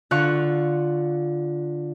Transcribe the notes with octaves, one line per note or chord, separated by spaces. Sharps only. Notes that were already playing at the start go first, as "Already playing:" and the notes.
D3 F4 F5 C#6 F#6